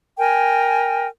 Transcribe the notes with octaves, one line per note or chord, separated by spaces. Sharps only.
A#4 G5 G#5